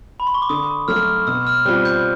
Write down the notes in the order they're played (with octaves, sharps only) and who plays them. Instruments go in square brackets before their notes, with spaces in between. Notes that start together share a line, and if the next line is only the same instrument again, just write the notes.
[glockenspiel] B5
C6
C#6
D6
[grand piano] D3 [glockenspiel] D#6
[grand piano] F#3 A3 [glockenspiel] F6
[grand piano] B2 [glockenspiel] E6
[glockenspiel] F6
[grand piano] G3 C4 F4 [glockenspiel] F#6
[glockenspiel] G6